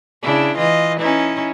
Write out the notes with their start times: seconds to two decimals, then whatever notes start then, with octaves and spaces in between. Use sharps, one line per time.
0.22 C#3 D4 E4
0.57 E3 F4 D#5
0.99 C#4 D#4 E4